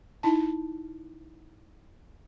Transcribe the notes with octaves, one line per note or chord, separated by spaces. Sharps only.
D#4 E4 A5